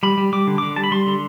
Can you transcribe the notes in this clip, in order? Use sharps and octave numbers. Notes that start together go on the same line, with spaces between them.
G3 B5
G3
G3 D6
D3
D3 D6
G3 A5
B5
G3 C6
D3